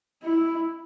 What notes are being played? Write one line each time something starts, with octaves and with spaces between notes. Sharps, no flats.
E4